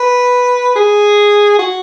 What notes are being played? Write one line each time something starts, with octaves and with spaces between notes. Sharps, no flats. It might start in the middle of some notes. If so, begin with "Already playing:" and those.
Already playing: B4
G#4
F#4